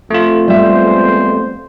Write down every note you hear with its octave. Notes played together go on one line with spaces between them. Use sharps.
F2 A3 F4
G3 G#3 B3 C5 E5